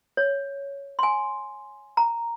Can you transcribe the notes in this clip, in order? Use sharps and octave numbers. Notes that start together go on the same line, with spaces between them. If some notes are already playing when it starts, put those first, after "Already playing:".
C#5
G#5 C6
A#5